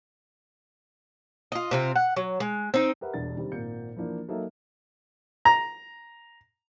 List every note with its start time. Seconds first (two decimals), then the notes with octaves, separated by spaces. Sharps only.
1.52 F4 D#5
1.71 C3 C4 F4
1.96 F#5
2.16 F#3
2.40 G#3
2.74 C4 D#4
3.01 G4 A#4 B4 E5 F#5
3.14 E1 G3 D4 A6
3.37 C3 D#3 G3
3.52 G#1 A#2 A#3 G6 C#7
3.96 E3 F3 A#3 D4
4.28 F#3 A#3 D#4 A4 D#5 E5
5.45 A#5